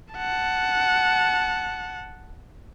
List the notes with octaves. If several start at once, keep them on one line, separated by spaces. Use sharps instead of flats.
F#5 A5